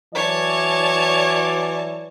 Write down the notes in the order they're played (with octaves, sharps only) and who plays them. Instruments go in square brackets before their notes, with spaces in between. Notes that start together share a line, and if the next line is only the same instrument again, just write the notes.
[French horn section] E3 F#3 D5 [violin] C#5 A5